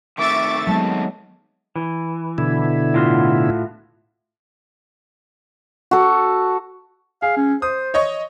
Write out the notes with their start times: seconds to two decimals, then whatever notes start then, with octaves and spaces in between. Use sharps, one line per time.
0.18 D#3 A3 C4 E5 C#6 D6 A6
0.67 F#3 G#3 B3 A5
1.76 E3
2.38 B2 D3 E4
2.94 A2 F4 F#4
5.91 F#4 A4
7.22 G#4 F5
7.37 C#4
7.62 C5 D#6
7.94 C#5 D#5 C#6